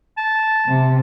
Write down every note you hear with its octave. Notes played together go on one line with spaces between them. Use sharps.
A5
C3